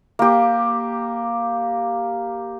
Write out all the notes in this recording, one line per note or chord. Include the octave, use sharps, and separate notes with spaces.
A#3 G4